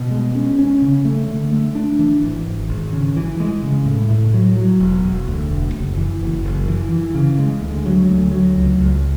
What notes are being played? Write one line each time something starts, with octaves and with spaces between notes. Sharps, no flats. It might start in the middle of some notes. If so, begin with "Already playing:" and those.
Already playing: B2
G#3
C#4
C#4
C#3
A3
D3
A3
D4
E3
G#1
G#1
G#1
C#3
E3
G#3
C#3
A2
A2
F#3
F#3
E1
E1
D2
E1
F#1
E3
F#1
F#1
E3
E3
C#3
G#3
D2
F#3
D2
F#3
C#2
C#2